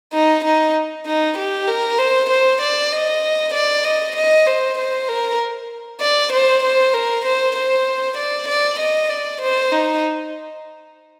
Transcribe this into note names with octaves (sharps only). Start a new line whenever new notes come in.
D#4
D#4
D#4
G4
A#4
C5
C5
D5
D#5
D5
D#5
D#5
C5
C5
A#4
D5
C5
C5
A#4
C5
C5
D5
D5
D#5
D5
C5
D#4